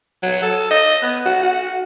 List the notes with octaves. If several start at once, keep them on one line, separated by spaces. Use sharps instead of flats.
F#3
A4
D#5
B3
F#4
F#4